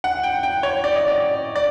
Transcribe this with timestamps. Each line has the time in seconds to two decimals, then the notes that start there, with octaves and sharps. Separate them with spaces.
0.04 F#5
0.24 G5
0.43 G5
0.63 C#5
0.84 D5
0.96 D#5
1.08 D5
1.56 D5